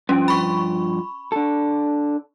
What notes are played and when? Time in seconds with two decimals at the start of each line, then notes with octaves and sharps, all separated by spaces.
0.09 G2 F3 C#4 G5
0.28 B5 C#6
1.32 D4 A4